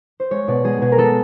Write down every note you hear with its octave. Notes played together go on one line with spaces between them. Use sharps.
C5
G#3 C#5
B2 D5
G#3 G#4
B2 G#4
A#4
G#3 A4